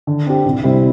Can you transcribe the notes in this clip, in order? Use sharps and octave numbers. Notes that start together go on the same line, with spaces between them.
D3
C4 G4
C2
C3 G3 C4 E4